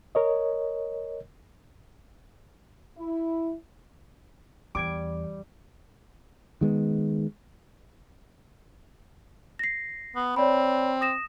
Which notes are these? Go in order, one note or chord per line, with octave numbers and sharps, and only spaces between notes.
A#4 C#5 D#5
E4
E2 G3 D6 G#6 D7
D#3 G#3 B3
A#6 C7
B3
C4 C#5 D5 B5
D#6 A#6 E7